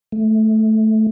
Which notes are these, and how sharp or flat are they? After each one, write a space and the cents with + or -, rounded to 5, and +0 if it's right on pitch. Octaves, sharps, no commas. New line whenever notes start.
A3 -10